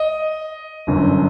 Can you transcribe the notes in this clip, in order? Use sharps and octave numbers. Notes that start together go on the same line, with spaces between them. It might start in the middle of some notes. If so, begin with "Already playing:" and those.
Already playing: D#5
G1 F#2 D3